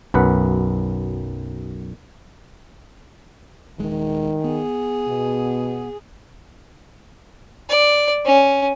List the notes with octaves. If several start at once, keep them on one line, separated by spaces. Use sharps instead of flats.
B1 F#2 B4 F#5
D#1 D#3 G#3
B3 G#4
B2
D5
C#4